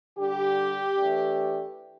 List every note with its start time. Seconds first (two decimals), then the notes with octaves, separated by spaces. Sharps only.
0.17 D3 G3 D4 G4
0.98 E3 A3 D4